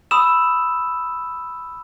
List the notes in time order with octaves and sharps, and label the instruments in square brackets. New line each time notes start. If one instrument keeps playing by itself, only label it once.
[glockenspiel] B5 D#6 E6 E7